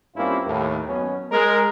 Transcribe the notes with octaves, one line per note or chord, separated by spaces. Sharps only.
G2 A#3 C4 C#4 E4 F4
D#2 A2
F#2 B2 C#4
G#3 A#4